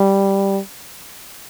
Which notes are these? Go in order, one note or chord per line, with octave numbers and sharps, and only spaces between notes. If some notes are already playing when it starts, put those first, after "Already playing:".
Already playing: G3